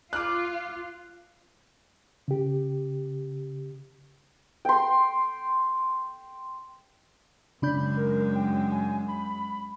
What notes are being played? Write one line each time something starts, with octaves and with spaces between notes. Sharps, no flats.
F4 D6 F6 F#6
C#3 G4
G5 C6
F#2 C#3 G#3 D4 B5 G6
A#4
G5
G#5
B5